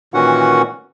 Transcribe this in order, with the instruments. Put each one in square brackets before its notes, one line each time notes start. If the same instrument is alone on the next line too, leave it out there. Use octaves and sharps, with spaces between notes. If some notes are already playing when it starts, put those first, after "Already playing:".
[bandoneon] A#2 D#3 E3 C#4 F#4 F#5